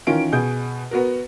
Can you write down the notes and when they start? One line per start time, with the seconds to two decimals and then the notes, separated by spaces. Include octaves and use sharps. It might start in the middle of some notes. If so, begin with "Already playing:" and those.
0.07 D#3 E3 C#4 F4 A#4 D7
0.32 B2 G#4 G6
0.91 B3 F#4 A#4